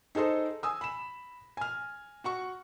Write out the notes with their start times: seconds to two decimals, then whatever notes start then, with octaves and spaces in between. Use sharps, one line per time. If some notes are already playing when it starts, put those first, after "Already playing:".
0.15 D#4 G#4 A4 C5 D#5
0.63 G#5 D#6 E6
0.81 B5 E7
1.57 G#5 F6
2.24 F#4 F#5 C#6